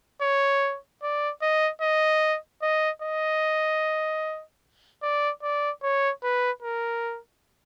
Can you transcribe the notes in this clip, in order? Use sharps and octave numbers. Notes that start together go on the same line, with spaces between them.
C#5
D5
D#5
D#5
D#5
D#5
D5
D5
C#5
B4
A#4